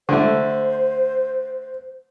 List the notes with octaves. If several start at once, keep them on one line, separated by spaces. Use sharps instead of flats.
D3 A3 C5